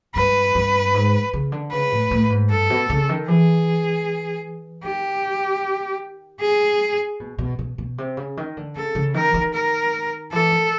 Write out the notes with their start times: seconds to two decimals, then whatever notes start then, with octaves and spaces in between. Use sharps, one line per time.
0.15 G2 B4
0.55 G2
0.94 G#2
1.33 C#3
1.52 D3
1.72 C#3 B4
1.92 A2
2.11 A2
2.30 G#2
2.50 G2 A4
2.70 B2
2.90 C#3
3.09 D#3
3.28 E3 G#4
4.84 D#3 G4
6.41 G#4
7.20 B2
7.38 B2
7.59 B2
7.78 B2
7.98 C3
8.17 C#3
8.37 D#3
8.57 D3
8.76 C#3 A4
8.95 C#3
9.14 D#3 A#4
9.34 D#3
9.54 A#4
10.32 E3 A4
10.52 D#3